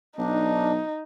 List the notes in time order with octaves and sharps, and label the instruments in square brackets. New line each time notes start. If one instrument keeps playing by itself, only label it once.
[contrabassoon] B1 [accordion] D4 [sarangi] D#4